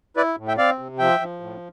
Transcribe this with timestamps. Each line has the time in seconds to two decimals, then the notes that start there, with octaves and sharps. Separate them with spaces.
0.17 E4 B4 D5
0.37 A2
0.48 E5 G5
0.58 C4 D5 F5
0.79 C3
0.99 F3 E5 G5
1.20 F3
1.40 A2